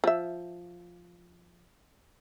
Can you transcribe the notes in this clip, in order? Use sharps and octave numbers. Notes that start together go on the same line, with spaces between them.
F3 E5